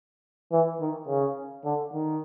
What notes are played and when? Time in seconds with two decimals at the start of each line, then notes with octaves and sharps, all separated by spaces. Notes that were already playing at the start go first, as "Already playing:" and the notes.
0.52 E3
0.80 D#3
1.08 C#3
1.65 D3
1.93 D#3